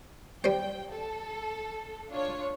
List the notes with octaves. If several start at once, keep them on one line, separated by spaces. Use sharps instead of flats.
G3 C5 G5
A4
D4 F4 C#5